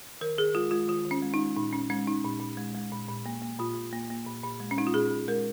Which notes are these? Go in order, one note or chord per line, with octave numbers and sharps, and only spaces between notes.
D#3 A#4
D#3 G#4
G#3 F4
G#3 F4
D#3 F4
D#3
C#4
G#3
D#4
G#3
A#2 D#4
A#2 C#4
G#3 C#4
G#3 D#4
A#2
A#2
G#3
G#3
A#2
A#2
A#3
A#3
A#2 F4
A#2
A#3
A#3
A#2
A#2
G#3
C#4
G#3 D#4
F4
A#2 G#4
A#2
G#3 A#4